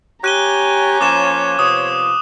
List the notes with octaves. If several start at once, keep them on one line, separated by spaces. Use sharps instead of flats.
G4 C#5 G#5 A#5 F#6 D#7 G7
F3 A#3 C#4 D6 E7
C3 F3 B3 D#6